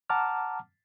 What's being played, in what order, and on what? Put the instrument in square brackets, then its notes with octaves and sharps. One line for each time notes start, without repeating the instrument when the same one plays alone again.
[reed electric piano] F#5 A5 A#5 D6 F6